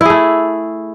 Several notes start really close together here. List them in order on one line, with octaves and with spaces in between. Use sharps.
E4 G#4 A3